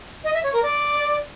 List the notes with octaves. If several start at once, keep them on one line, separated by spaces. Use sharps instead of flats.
D#5
E5
C#5
A#4
D5